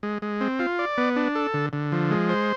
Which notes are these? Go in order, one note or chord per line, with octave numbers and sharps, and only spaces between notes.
G#3
G#3
C4
F4
D5
B3
D4
A4
D3
D3
F3
G#3
C5